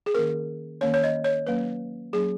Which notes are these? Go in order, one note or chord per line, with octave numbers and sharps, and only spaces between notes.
G#4
D#3 A#3 C#4 A#4
D#3 A#3 C#4 C#5
C#5
D#5
C#5
F#3 A#3 C#4 B4
F#3 A#3 C#4 G#4